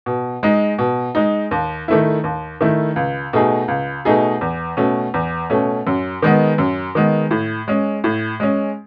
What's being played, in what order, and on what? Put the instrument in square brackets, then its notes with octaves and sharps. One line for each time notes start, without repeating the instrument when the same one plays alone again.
[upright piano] B2
G#3 D#4
B2
G#3 D#4
D#2
D#3 A3 E4
D#2
D#3 A3 E4
C#2
B2 A3 D#4 G#4
C#2
B2 A3 D#4 G#4
E2
B2 A3 C#4
E2
B2 A3 C#4
F#2
D#3 G#3 B3
F#2
D#3 G#3 B3
A2
G#3 C#4
A2
G#3 C#4